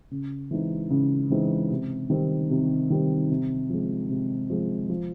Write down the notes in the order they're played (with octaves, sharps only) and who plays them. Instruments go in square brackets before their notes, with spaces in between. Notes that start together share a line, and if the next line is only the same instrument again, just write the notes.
[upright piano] C#3
E3 G#3 C4 D#4
C#3
E3 G#3 C4 D#4
C3
D#3 G3 C4
C3
D#3 G3 C4
C3
F3 G#3
C3
F3 G#3
F3